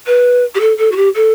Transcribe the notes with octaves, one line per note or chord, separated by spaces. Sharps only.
B4
G4
A4
A4
F#4
G4
A4